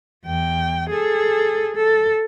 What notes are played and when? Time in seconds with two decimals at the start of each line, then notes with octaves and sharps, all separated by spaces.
0.25 E2 G5
0.90 G#4 A4
1.76 A4